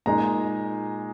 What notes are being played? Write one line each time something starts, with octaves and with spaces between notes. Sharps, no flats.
A#2 G#3 D#4 A#5